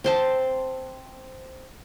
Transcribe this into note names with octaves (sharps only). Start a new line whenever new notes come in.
C4 C5 A5